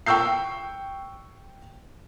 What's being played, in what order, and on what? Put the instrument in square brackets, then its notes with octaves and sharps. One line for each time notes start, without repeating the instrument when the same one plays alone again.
[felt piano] G5 C#6 E6 G6 C7